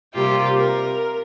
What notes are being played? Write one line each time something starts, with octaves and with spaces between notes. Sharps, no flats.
C3 G3 A#3 F4 G4
A#4